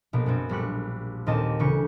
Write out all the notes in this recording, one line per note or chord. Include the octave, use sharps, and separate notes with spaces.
A#1 B2 A#3
F#2 B3 C4
A#1 G3 C#6 F#6
D#2 A#2 C4 D#5 A5
D2 C#3 E3 C#6 G6